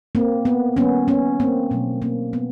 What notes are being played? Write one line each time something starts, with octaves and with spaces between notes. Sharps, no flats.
A#3 C4
B3
D#3 G3 A#3 B3 C#4
B3 C#4
A#3 C4
B2 F#3 A3
A#3 C4
B3